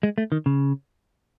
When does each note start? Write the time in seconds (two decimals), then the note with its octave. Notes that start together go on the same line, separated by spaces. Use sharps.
0.03 G#3
0.18 A3
0.32 D#3
0.46 C#3